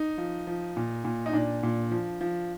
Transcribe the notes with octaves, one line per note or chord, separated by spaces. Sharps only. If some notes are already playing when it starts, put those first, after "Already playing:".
Already playing: D#4
F3
F3
A#2
A#2
D#4
A#2 D4
A#2
F3
F3